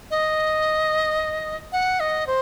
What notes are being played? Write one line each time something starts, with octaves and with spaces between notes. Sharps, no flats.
D#5
F#5
D#5
C5